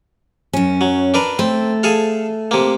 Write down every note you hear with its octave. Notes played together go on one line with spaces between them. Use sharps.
F#2 C#4
F#3
D4 A#4 B4
A3 C4
G#4 A4 F5
C3 A#3